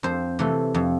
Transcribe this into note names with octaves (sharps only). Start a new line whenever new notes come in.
F2 C5
C3 E3 A3
F2